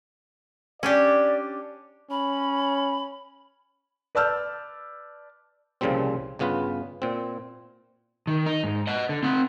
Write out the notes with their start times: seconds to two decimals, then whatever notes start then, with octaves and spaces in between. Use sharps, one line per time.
0.83 C#4 D4 G4 D5
2.11 C#4 B5
4.15 B4 D5 A5 E6 F6 G6
5.81 C2 A#2 C#3 F3 G3 C4
6.39 G1 C#3 B3 F4 B4
7.02 A#2 C4
8.27 D#3
8.46 D#4
8.64 G#2
8.87 D#5 F#5
9.09 D3
9.23 C4 F#5